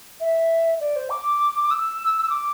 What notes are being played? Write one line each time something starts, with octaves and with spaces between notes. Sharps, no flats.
E5
D5
C5
D6
D6
E6
E6
D6